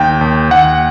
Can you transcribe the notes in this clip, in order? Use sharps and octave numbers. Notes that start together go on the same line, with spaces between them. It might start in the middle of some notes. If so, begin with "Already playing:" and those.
Already playing: D#2 G5
D#2
D#2 F#5